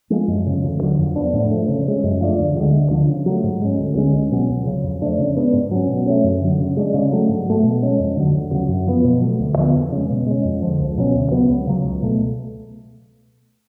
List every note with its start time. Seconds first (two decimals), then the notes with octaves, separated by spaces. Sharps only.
0.10 F3 G#3
0.28 F#2
0.46 C#3 F3
0.63 D2
0.81 D3 F#3
0.99 F2
1.16 F3 B3 D4
1.33 A2
1.51 F3 A3
1.69 C#3
1.87 G#3 C#4
2.04 F#2
2.21 F3 A3 D4
2.38 D2
2.56 D3 G#3
2.74 D2
2.91 D3 F3
3.08 C#3
3.26 F#3 A3
3.44 G#2
3.61 G#3 C#4
3.78 D2
3.96 D3 G#3 C#4
4.13 C#2
4.31 B2 F#3 C#4
4.49 C#2
4.66 C#3 F#3
4.84 F2
5.02 F3 A3 D4
5.19 C#3
5.36 G#3 B3 D4
5.53 G#2
5.71 F#3 C#4
5.88 B2
6.06 A3 C#4
6.24 F#2
6.41 D3 F#3
6.59 C#3
6.77 G#3 D4
6.94 C#3
7.12 F#3 A3
7.29 G#2
7.46 F#3 A3
7.63 B2
7.82 G#3 C#4
8.00 F2
8.16 D3 F#3
8.34 D2
8.51 C#3 F#3
8.69 F#2
8.87 F3 B3
9.04 B2
9.22 F#3 A3
9.40 D2
9.57 D3 F3 B3
9.75 F2
9.92 C#3 G#3
10.09 B2
10.26 G#3 C#4
10.45 F2
10.62 D3 F3
10.79 C#2
10.97 B2 F#3 C#4
11.15 D2
11.31 C#3 F#3 B3
11.49 C#2
11.67 C#3 F#3
11.84 C#2
12.02 B2 A3